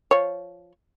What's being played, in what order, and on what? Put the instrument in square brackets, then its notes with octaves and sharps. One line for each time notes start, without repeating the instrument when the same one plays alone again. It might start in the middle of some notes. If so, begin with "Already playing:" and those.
[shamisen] F3 C#5